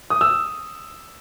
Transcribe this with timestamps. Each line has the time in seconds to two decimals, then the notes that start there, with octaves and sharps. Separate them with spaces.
0.10 D#6
0.21 E6